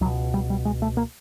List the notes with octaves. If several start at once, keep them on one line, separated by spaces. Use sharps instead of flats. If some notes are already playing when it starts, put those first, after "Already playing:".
C#2 B2 F#3
G3
G3
G#3
A3
A#3